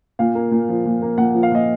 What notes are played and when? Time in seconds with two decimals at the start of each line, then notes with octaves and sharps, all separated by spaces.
0.19 A#2 F5
0.35 A#3
0.51 A#2
0.69 F3
0.85 A#2
1.02 A#3
1.17 A#2 F#5
1.34 F3
1.43 F5
1.51 A#2 D#5